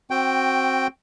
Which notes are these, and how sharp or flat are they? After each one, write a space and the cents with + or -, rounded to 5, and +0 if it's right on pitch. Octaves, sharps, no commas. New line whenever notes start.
C4 +20 F#4 +0 G5 +0